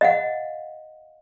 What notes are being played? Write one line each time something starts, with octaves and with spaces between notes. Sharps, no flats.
D#5 F5 F#5